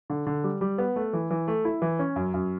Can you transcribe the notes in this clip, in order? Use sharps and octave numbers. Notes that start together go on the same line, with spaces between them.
D3
D3
G3
G3
B3
A3
E3
E3
A3
E4
E3
C#4
F#2
F#2